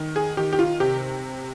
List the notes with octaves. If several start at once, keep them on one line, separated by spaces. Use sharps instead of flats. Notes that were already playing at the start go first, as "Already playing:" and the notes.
Already playing: D#3
G#4
D#3 G4
G4
F4
C3 G4